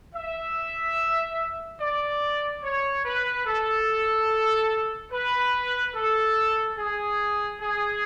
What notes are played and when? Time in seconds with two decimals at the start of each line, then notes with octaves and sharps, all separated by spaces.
0.15 E5
1.81 D5
2.64 C#5
3.05 B4
3.46 A4
5.12 B4
5.95 A4
6.78 G#4
7.61 G#4